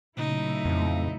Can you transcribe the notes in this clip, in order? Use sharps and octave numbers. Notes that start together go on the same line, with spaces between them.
A#2 C#3 F#3 A3 D#4 E4
F2